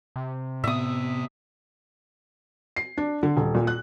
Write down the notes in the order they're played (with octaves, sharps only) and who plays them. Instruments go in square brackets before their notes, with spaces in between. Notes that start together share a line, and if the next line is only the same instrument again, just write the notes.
[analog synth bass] C3
[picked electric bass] A2 B3 [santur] E5 D#6
[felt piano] C7
D4
D3
D#1
A#2
F#6